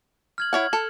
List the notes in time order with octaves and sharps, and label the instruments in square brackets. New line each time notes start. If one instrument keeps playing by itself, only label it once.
[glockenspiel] F6 G#6 F#7
[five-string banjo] E4 C#5 F#5 [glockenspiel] G#6 F#7
[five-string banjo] A4